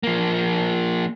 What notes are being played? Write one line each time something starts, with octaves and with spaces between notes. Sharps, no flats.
F3 A#3